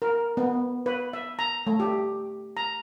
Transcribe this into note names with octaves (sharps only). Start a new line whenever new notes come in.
A#4
B3
B4
E5
A#5
A3
G4
A#5